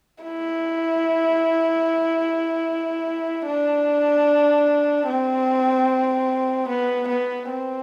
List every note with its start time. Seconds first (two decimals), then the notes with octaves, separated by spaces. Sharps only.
0.23 E4
3.46 D4
5.07 C4
6.69 B3
7.09 B3
7.50 C4